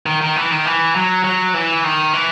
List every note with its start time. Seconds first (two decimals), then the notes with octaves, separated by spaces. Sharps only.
0.06 D#3
0.21 D#3
0.36 E3
0.51 D#3
0.65 E3
0.95 F#3
1.24 F#3
1.54 E3
1.84 D#3
2.13 E3